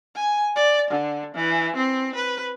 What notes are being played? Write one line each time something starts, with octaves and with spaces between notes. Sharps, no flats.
G#5
D5
D3
E3
C4
B4